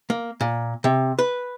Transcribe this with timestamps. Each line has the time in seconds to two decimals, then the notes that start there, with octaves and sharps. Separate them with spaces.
0.10 A#3
0.41 A#2
0.84 C3
1.19 B4